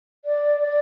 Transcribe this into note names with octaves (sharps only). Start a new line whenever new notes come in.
D5
D5